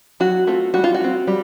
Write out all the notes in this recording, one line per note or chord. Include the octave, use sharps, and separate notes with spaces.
F#3 F#4
A3 C4 F4
G3 F#4
F4
F#4
C4 F4
G3